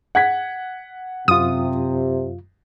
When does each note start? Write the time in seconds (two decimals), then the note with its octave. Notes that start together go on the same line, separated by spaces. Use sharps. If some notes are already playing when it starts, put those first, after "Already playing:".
0.15 F#5 G#6 B6
1.28 F#2 C3 F4 D#6